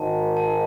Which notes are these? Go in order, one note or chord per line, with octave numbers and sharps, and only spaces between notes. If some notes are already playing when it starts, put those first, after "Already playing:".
Already playing: G#1 G#2 D#3 A5
A5